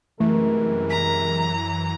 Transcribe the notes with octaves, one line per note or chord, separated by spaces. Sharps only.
F#2 C3 E3 G#3 A3 A#4
A#5 B6